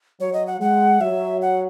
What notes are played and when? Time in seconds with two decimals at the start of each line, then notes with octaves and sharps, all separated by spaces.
0.20 F#3 C#5
0.33 D#5
0.47 F#5
0.60 G#3 F#5
1.00 F#3 E5
1.42 F#5